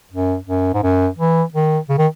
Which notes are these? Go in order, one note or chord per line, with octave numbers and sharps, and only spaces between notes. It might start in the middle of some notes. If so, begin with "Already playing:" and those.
F#2
F#2
G#2
F#2
E3
D#3
C#3
D#3